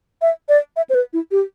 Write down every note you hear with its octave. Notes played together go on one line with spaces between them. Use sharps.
E5
D5
E5
C5
B4
E4
G4